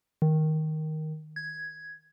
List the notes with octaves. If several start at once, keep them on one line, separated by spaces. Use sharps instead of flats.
D#3
G#6